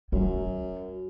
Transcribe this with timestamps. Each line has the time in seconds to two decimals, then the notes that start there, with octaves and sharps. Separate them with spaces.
0.12 F#2 F#3